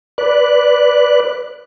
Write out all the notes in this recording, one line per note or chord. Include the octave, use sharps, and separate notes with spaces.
B4 D5 F#6